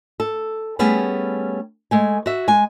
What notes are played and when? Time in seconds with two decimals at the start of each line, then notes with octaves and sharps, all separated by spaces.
0.20 A4
0.79 G3 A3 B3 C#4 G#4
1.91 G#3 A3 G#5
2.26 F#4 E5
2.48 G#3 G#5